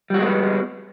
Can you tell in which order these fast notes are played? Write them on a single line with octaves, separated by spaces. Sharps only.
G3 F#4 G#3 A#3 B3